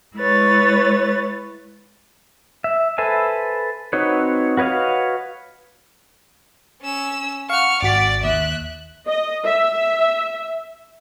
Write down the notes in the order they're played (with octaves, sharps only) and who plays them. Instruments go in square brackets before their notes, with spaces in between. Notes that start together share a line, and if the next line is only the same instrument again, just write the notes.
[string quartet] G#3 E4 B4 C#5 A6
[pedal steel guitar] E5
A4 B4 C5 E5 G#5
C4 D#4 F#4 B4 C#5
F#4 B4 C#5 D#5 F5
[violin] C#4 E6
[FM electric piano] F5 F#5 [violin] C#6 F6
[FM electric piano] G#1 F#4 B6 [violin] D5 D6
[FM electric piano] D#2 [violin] E5 F#6
[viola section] D#5
E5